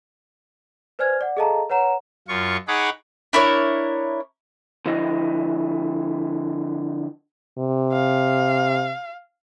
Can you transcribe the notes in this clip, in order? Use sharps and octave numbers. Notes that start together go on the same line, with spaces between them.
B4 C5 D5 G#5 F6 G#6
D5 F#5
G#4 A4 D#5 F5 A5 A#5
B4 C#5 F#5 A#5 E7
F#2 F4 C#6
D#4 G#4 C#5 F#5 B5 D6
D4 E4 A#4 C#5
D3 F3 E4 D#5
C3
F5